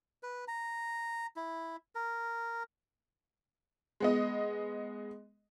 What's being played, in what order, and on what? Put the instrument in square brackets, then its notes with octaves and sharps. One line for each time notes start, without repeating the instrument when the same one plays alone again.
[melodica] B4
A#5
E4
A#4
[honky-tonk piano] G#3 B3 D#5